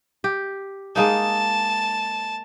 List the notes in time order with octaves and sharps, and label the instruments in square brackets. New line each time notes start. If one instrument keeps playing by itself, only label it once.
[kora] G4
[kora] G#3 A#3 D#4 [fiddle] A5